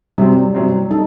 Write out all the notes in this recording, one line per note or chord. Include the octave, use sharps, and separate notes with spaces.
C3 F#3 G3 C4
C3 F#3 C4
D#4 A4